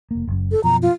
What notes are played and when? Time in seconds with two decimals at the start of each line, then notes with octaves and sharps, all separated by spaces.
0.11 F1 A#3
0.27 F#1 F#2
0.52 A4
0.64 F#2 B2 F3 A#5
0.83 F4